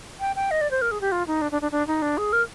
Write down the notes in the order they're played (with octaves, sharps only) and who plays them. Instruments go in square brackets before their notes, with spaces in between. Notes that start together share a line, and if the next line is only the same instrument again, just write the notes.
[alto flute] G5
G5
D#5
D5
C5
A#4
G#4
G4
F4
D#4
D4
D4
D4
D4
D#4
D4
G#4
A#4